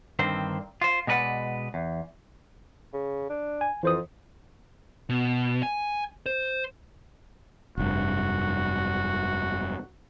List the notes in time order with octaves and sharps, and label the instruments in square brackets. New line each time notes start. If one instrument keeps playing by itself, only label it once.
[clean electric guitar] G2 D3 D#3 C4 C5
F4 C5
B2 G#3 A#4 B4 D5 F#5
E2
[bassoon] C#3
D4
[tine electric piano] G#5
[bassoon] F2 [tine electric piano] E3 C5 D#6
[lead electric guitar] B2
G#5
C5
[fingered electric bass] F1 G2 [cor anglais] F#4